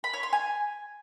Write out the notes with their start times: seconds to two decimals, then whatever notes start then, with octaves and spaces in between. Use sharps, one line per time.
0.04 B5
0.13 C#5
0.23 C6
0.33 G#5